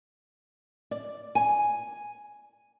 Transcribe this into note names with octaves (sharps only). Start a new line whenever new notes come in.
D5
G#5